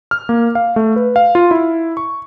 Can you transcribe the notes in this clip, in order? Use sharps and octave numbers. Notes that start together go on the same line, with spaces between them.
F6
A#3
F5
A3
B4
F5
F4
E4
C#6